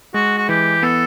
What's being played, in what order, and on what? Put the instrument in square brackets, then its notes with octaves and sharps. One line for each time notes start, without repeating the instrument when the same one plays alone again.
[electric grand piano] G#3 [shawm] F#4
[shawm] F#4
[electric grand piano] E3 [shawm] G4
[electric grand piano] B3 [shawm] A4